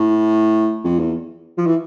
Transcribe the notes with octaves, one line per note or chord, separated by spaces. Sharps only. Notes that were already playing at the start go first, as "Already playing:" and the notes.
Already playing: A2
F2
E2
F3
E3